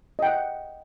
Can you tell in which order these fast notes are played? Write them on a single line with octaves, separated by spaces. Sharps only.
D#5 G5 F#5